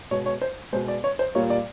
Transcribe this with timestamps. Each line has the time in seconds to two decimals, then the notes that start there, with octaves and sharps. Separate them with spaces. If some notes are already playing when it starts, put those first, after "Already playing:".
0.11 B2 G#3 C#5
0.26 C#5
0.42 C5
0.73 B2 G#3 C5
0.88 D5
1.04 C#5
1.19 C5
1.35 A#2 G3 A#3 C#5
1.50 D5